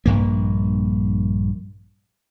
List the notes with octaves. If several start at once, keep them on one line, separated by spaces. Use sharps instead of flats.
A#1 G2 A#3